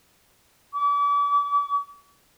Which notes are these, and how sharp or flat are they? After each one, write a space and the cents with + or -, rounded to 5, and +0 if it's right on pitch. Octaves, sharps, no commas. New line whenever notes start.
D6 -40